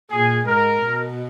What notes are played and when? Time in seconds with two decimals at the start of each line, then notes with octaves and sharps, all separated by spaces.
0.10 A#2 G#4
0.46 G#2 A#4
0.82 B2